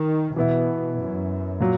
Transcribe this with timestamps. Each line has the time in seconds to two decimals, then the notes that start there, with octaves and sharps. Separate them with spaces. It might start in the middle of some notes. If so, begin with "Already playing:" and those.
Already playing: D#3
0.36 B2 E3 B3 E4
0.99 F#2
1.60 A#2 F#3